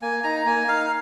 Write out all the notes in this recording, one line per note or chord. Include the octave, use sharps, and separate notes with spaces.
A#3 G#5
D#4 A#5
A#3 G#5
D#4 F5